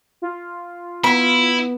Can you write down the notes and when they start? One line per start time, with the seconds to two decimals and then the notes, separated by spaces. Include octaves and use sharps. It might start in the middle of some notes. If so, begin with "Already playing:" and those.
0.22 F4
1.04 B3 E4 B5